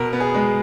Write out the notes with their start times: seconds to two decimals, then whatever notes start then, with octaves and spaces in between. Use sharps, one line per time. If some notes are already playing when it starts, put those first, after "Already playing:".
Already playing: B2 A#4
0.13 B3
0.20 G#4
0.34 G#3